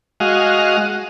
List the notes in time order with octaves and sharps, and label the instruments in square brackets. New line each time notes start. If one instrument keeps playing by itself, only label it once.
[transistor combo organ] G#3 F#4 D#5 F5